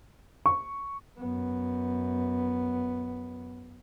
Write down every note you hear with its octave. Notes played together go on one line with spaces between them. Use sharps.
C#6
F#2 B3